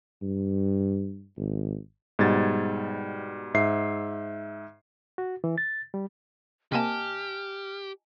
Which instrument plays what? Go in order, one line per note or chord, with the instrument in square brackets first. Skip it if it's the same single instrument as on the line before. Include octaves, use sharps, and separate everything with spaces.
[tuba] G2
G#1
[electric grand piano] G#2 B2 G3 G#6 A6
G#2 E5 C7
[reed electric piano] F#4
E3
A6
G3
[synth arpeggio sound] C3 A#3 [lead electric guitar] G4 [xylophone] D#5 G#5 A5 [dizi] F6